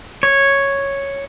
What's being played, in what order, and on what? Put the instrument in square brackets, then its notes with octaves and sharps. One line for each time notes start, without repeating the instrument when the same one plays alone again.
[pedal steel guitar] C#5